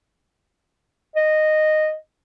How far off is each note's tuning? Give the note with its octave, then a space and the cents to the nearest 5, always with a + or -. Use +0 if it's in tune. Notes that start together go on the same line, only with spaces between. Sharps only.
D#5 -10